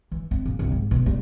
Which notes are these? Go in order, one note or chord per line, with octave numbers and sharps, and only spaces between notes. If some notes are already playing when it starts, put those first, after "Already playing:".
E3
C4
A#2
C2
G#2
B2
G3